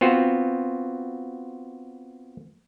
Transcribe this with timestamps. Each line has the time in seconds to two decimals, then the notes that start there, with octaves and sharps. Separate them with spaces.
0.01 B3 C4 F4 F#4